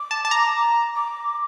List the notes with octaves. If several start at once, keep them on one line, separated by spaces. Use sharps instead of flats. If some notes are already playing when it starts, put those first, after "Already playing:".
Already playing: D6
A5
A5
A#5
D6